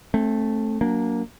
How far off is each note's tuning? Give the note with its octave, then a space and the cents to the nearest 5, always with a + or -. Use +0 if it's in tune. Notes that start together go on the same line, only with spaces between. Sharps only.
A3 +0 C4 +35
F#3 +0 A#3 +0 D4 -30